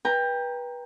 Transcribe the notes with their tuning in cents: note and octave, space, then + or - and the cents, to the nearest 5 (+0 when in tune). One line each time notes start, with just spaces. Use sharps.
B4 -25 G5 +20 A#5 +0